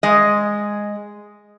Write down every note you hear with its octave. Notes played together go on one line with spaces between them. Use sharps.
G#3 D#5